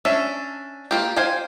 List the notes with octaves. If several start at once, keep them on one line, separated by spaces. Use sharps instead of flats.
C#4 D4 E5
A#3 F4 G4
C5 F5 G5 G#5